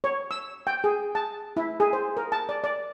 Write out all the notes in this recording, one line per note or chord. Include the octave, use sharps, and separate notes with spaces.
C#5
E6
G5
G#4
A5
E4
G#4
C5
A#4
A5
D5
D5